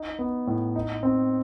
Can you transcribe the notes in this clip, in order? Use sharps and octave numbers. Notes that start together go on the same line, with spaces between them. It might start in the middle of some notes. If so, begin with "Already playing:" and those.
Already playing: D#4
B3
A2
D#4
C4